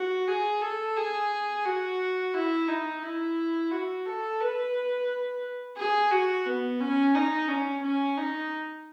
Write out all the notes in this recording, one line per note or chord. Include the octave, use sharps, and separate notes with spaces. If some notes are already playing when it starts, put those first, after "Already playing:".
Already playing: F#4
G#4
A4
G#4
F#4
E4
D#4
E4
F#4
A4
B4
G#4
F#4
B3
C#4
D#4
C#4
C#4
D#4